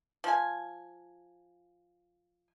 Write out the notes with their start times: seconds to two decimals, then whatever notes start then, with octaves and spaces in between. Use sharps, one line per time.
0.24 F3 G#5